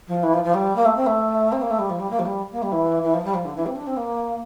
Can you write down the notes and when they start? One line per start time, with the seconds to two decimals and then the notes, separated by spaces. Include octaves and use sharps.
0.07 F3
0.22 E3
0.33 F3
0.43 F3
0.53 G3
0.75 A#3
0.85 A3
0.95 C4
1.06 A3
1.51 C4
1.61 A#3
1.70 A3
1.78 G3
1.89 F3
1.98 G3
2.10 A#3
2.18 F3
2.25 G3
2.51 A#3
2.62 G3
2.71 E3
3.02 E3
3.13 F3
3.23 G3
3.33 F3
3.44 D3
3.55 E3
3.65 C4
3.75 D4
3.86 C4
3.96 A#3